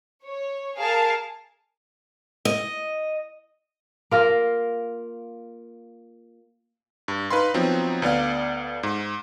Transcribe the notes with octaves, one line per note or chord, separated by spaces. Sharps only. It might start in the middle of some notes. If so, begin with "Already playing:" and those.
C#5
G#4 A#4 F5 A5
D#5
A#3 F4 A#4
G2
D#4 B4 F5 B5 C6
F3 F#3 B3 C4 D#4
D2 B3 D5 F5
G#2